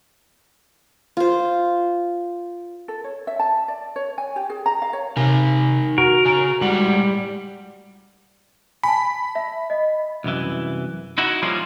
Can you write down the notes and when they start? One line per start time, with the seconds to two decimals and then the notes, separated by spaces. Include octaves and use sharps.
1.17 F4 C5
2.88 A4
3.04 C#5
3.27 E5
3.39 A5
3.68 D5
3.96 C#5
4.18 G#5
4.36 G4
4.50 G#4
4.66 A#5
4.82 F5
4.93 C#5
5.17 C3 D#4 A#4 G#5
5.98 F#4 A#4
6.25 C#3 G#5
6.61 A2 G3 G#3 F#5
8.83 G#5 A5 B5
9.35 E5
9.70 D#5
10.24 C2 F#2 E3
11.18 D#4 E4 F#4
11.42 F3 G3 A#3 C#4 F4